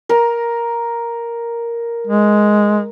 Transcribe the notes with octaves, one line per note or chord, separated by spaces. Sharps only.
A#4 A#5
G#3